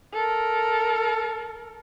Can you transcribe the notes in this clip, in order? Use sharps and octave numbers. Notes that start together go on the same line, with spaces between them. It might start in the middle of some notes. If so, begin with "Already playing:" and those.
A4 A#4